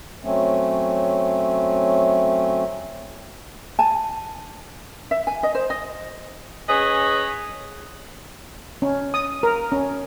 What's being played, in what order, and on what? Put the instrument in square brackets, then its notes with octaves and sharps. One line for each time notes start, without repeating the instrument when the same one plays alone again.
[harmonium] F#3 A3 C4 C#4
[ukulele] G#5 A5
E5
G#5
D#5
C5
D#5
[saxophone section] C#4 G#4 B4 C#5 D#5
[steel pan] C#4
D#6
A#4
C#4